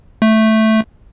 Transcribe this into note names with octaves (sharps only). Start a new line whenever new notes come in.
A3